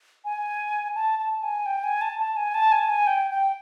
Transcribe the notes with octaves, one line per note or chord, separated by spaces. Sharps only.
G#5
A5
A5
G#5
G5
G#5
A5
A5
G#5
A5
G#5
A5
G#5
G5
G5